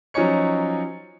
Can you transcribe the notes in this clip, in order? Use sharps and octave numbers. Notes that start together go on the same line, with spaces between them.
F3 F#3 C#4 D#4 C#5 C#7